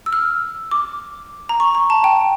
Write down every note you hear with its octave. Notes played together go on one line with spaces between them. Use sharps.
E6
F6
D6
A#5
C#6
A#5
A5
G5